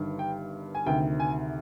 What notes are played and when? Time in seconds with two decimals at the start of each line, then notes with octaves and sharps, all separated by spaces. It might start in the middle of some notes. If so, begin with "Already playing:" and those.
Already playing: G1 G2 D#3
0.19 G5
0.75 G#5
0.86 D2 C3 D#3 G5
1.20 G#5